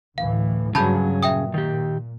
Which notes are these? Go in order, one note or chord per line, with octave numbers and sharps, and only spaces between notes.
D2 A2 E3 F5
G2 C#3 F#3 G#4 A5 B5 G6
A#2 E5 G5 D#6
D#3 G4